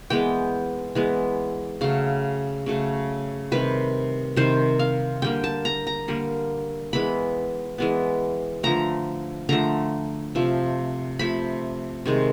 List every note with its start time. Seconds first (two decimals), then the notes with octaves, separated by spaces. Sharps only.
0.10 E3 G#3 B3 G5
0.95 E3 G#3 B3
1.81 C#3 F#3 A3 F5
2.66 C#3 F#3 A3
3.52 C3 D#3 G3 B4
4.36 C3 D#3 G3 C5
4.79 F5
5.22 D3 G3 A#3 G5
5.44 A5
5.65 A#5
5.87 A#5
6.08 D3 G3 A#3
6.93 E3 G#3 B3 B5
7.78 E3 G#3 B3
8.63 D3 F3 A3 A#5
9.49 D3 F3 A3 A#5
10.35 C3 F3 A3
11.19 C3 F3 A3 B5
12.05 C3 D#3 G#3